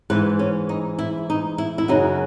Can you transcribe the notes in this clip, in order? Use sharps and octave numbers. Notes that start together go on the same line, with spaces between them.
G#2 E3 B4
C#4
D#4
E4
D#4
E4
E4
F#2 C#3 F#3 D#4